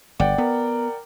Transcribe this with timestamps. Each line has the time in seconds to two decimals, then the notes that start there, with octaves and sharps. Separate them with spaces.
0.20 G1 D5 F#5 G5
0.38 B3 A#4